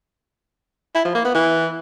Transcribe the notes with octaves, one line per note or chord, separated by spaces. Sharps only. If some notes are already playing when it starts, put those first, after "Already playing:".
E4
F3
A#3
B3
E3